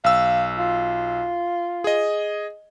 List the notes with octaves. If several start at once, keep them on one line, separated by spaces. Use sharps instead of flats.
B1 F5 E6
F4
G#4 D#5